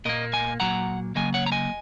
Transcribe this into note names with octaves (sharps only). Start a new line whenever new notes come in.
A#2 A#3 A#4 D#5
D#5 G#5
A#2 F#3 A#3 F#5 A#5
C#3 F#3 A#3 D#5 G#5
C#5 F#5
A#5
D#5 G#5